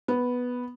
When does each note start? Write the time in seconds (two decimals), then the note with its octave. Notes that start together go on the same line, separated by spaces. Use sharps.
0.08 B3